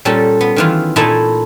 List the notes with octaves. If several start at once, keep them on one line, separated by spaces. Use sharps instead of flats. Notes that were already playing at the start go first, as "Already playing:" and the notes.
A#2 G3 C#4 A4 A5
B3
D#3 E3 F4
A#2 A3 D#4 E4 G#5 A5